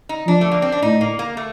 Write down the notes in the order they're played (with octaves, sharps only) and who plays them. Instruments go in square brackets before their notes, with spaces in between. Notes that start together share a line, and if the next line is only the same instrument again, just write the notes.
[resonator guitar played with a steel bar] D#4
[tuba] F3 [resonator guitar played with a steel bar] D4
[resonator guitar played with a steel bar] A3
A#3
C4
D4
[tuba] A2 [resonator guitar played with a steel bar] D#4
[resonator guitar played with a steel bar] A#3
A#3
A3